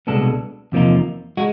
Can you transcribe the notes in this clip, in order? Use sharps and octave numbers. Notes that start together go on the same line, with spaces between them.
C2 B2 G#3 B3 D4 A4
E2 C3 F3 A#3 D#4
G#3 F#4